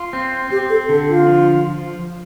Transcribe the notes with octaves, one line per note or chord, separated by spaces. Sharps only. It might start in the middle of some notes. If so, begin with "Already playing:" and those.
Already playing: F4
C4
C4 G4
A4
D3 A4
F4
F3